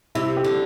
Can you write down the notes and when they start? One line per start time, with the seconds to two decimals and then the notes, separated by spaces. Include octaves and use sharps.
0.15 C3 E4
0.37 G4
0.44 D3